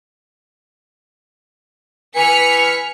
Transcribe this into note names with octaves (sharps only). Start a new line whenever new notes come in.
B4 G#5 F6 B6 C#7